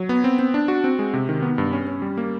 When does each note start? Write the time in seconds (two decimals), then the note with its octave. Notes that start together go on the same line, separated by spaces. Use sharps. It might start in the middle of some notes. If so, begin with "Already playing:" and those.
Already playing: F#3
0.09 B3
0.24 C4
0.39 C4
0.54 D4
0.68 F#4
0.84 C4
0.99 G#3
1.14 C3
1.29 D#3
1.42 B3
1.58 G2
1.72 C#4
1.87 C#4
2.02 G3
2.17 A#3